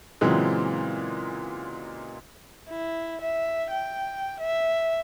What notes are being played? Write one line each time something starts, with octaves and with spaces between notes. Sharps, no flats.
A#2 C#3 E3 F#3 G#3 C4
E4
E5
G5
E5